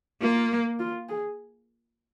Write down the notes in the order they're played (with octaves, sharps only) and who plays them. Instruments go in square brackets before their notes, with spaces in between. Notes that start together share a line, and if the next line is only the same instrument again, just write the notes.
[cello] A#3 [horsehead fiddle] F4
[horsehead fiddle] F4
G#4